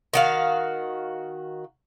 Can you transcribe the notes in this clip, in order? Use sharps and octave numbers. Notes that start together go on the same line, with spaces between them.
D#3 F#4 F5